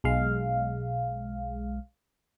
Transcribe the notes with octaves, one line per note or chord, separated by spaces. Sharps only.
B1 G#3 F5